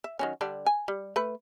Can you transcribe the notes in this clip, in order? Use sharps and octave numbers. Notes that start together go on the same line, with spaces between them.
E5
D#3 F#3 C#4
D3 G3 D4
G#5
G3
A3 B4